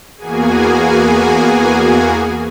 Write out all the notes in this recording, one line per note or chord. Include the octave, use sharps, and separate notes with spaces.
E2 A#3 B3 F#4 G#4 G#5